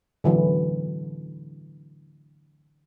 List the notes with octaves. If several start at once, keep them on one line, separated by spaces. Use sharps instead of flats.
D3 E3 F#3